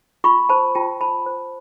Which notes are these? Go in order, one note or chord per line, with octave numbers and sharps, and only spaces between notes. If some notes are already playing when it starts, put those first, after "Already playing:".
F4 B5 C#6
C5 A5 B5
F4 G5 A5
C5 A5 B5
C5